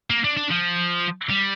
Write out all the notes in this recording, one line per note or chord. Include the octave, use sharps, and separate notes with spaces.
A#3
D4
D4
F3
G3